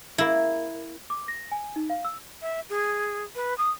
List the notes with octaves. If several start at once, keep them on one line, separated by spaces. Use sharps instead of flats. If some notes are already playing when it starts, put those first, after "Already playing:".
A#3 E4
D6
A#6
G#5
D#4
F5
E6
E5
G#4
B4
D#6